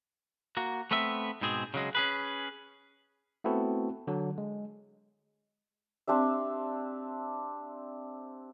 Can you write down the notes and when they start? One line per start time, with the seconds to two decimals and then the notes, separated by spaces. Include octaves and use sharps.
0.57 A#3 F#4
0.91 A3 B3 C4 E5
1.41 G#2 B2 C4 G#4
1.74 C#3 F#3 G#3
1.95 C#4 G#4 B4
3.44 A3 B3 C4 E4 F#4 A4
4.07 D3 F#3
4.38 G#3
6.07 C4 D4 G4 E5